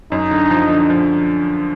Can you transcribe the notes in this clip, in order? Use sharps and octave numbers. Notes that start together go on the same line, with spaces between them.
F#2 D#4
D3
F3
D3
F3